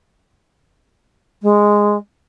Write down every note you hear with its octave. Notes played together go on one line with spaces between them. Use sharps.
G#3